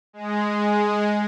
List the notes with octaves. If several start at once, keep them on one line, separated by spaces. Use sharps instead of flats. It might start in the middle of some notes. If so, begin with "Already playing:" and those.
G#3